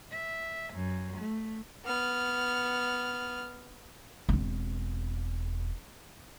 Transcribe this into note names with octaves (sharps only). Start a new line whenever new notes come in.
E5
F#2
A3
B3 F6
E1 C4